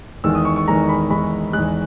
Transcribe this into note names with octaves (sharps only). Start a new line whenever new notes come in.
E2 D#3 G#3 E6
D#6
C#6
C#6
E2 D#3 G#3 A#5
B5
E2 D#3 G#3 B5
E2 D#3 G#3 F#6